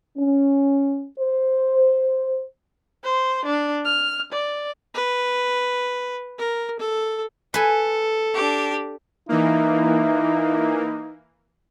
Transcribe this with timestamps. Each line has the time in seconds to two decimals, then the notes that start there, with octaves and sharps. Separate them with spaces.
0.18 C#4
1.18 C5
3.04 C5
3.45 D4
3.85 F6
4.33 D5
4.94 B4
6.39 A#4
6.79 A4
7.54 A4 B4 G#5
8.34 D4 G4
9.29 E3 A#3 D#4 E4